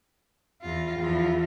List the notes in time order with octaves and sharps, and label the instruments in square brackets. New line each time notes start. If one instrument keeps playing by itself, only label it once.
[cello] E2 F4
[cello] E2 [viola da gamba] F3 E4 F4